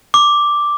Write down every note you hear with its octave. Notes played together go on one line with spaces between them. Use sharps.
D6